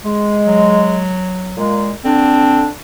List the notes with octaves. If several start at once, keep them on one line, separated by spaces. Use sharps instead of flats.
G#3
F#3
A#2 G#3
D3 C4 D4